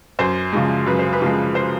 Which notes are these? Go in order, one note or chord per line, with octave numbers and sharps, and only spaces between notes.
F#2 C5
C#3 F3 G#3
F#2 B4
C5
B4
C#3 F3 G#3
C5